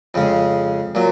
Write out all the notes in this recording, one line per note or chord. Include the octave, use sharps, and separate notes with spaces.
F2 C#3 G#3
A#2 F#3